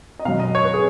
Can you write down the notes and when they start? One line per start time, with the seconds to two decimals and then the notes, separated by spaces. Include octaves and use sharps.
0.19 D#5
0.25 B2 F#3 F5
0.39 D#5
0.55 C#5
0.64 B4
0.74 G#4